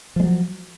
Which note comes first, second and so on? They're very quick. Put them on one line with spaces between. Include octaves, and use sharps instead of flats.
F3 G#3 F#3